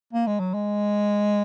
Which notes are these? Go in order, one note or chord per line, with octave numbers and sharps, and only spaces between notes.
A#3
G#3
F#3
G#3